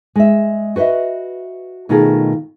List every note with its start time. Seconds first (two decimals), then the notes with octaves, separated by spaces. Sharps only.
0.16 G#3 E5
0.76 F#4 B4 C5 D#5 E5
1.89 B2 D#3 A3 F4 G#4